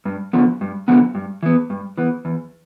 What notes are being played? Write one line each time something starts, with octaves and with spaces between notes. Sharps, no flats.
G2
D3 F3 B3
G2
D3 F3 B3
G2
E3 B3
G2
E3 B3
E2